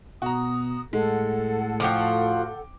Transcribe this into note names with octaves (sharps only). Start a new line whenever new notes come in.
B2 F#4 A#5 D#6
A2 G#3 A4 F#5
F3 F4 F#4 G5 D6